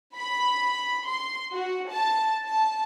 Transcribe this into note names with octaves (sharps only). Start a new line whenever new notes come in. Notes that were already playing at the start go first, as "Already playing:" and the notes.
B5
C6
F#4
A5
A5